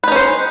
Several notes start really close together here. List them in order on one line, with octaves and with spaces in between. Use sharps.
B4 D#4 C#4 C5